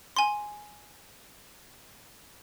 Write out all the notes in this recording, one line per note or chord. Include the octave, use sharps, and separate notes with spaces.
G#5 C6